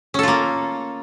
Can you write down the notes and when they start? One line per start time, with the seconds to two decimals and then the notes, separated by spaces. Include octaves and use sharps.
0.14 C#4
0.19 A4
0.23 F4
0.28 A#3